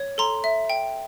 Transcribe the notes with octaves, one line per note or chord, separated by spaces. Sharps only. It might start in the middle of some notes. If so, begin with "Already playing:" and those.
Already playing: C#5
A4 A#5 C6
E5
G5